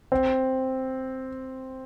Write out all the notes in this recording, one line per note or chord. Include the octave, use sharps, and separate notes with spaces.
C4